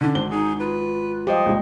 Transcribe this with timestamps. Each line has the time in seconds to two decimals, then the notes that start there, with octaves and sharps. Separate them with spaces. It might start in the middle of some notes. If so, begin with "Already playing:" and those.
0.01 D3 C#4 D4
0.15 G#1 C5 G7
0.31 D#4 G#4
0.60 F4 B4
1.27 F3 G4 D#5
1.46 C#2 A#2